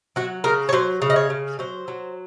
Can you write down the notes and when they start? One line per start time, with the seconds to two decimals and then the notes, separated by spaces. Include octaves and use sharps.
0.16 F#3 F#4
0.44 C#3 A#4
0.69 C#5
0.73 F#3 C5
1.02 C#3
1.10 D#5
1.16 C#5
1.30 C#3
1.59 F#3 C5
1.88 F#3